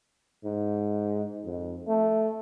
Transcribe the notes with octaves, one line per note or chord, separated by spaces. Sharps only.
G#2
F2
A3